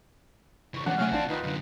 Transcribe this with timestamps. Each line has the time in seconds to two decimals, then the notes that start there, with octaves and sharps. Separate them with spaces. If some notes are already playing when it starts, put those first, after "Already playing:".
0.74 C#2 E3 C#6
0.86 E3 F3 G#3 C#4 D4 C#5 F#5
0.98 C3 F#3 A3 C#4 G#5 C#6 F6
1.11 A1 C4 D4 F4 D5 F5 A5
1.28 D#2 D#4 F4 B4
1.43 F#2 D3